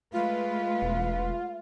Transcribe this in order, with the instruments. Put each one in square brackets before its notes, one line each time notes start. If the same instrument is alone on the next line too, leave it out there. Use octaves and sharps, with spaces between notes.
[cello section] G#3 A3 B4 [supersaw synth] F4 [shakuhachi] F5
[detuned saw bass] E1